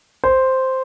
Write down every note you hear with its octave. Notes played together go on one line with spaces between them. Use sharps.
C5